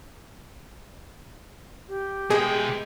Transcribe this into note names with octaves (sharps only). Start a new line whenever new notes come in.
G4
B2 G#3 G#4 G5